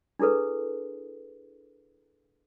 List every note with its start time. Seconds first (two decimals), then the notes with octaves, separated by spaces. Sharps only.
0.19 D4 E4 G#4 A4 B4